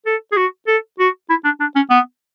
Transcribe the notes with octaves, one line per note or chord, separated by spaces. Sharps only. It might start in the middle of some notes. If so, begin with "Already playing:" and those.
A4
G#4
F#4
A4
F#4
E4
D4
D4
C#4
B3